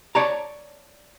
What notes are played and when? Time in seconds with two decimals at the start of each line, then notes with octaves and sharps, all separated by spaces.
0.15 C#5 D5 A5 A#5